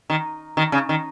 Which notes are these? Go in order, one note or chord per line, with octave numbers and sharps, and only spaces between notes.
D#3
D#3
C#3
D#3